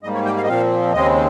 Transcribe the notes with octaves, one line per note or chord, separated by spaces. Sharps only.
G#2 G3 A#3 D#5
C#5
G5
F5
D#5
A#2 F3 C4 F5
D#2 C#3 G#3 C4 D#5